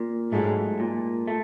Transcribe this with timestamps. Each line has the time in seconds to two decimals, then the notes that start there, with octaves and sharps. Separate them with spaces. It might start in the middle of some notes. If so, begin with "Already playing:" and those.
Already playing: A#2
0.32 G#2 F#3 A3
0.80 A#2
1.28 A3